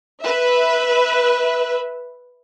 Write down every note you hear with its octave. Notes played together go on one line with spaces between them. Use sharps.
B4 E5